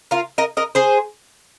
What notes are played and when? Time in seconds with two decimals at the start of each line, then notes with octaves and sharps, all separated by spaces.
0.11 F4 A#4
0.38 A#4 D#5
0.57 A#4 D#5
0.75 G#4 C5